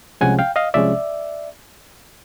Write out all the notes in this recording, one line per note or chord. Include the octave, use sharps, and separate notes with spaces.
C2 C3 F3 G#3 C#4 F#5 G#5
F5 G5
D#5 F5
C2 C3 F3 G#3 C#4 D5 E5